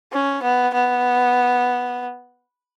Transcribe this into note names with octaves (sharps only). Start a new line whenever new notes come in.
C#4
B3
B3